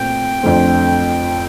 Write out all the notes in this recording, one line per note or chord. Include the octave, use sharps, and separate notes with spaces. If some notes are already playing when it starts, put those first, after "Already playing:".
Already playing: A#2 A3 C4 G5
F2 D3 A3 C4